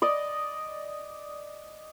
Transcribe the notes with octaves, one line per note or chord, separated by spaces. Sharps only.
D5 D#5